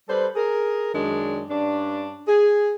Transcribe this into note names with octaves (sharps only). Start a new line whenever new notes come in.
G3 A4 B4 C5
G#4 A#4
F#2 D#3 G#3 D4
G2 C#4 D4
G#4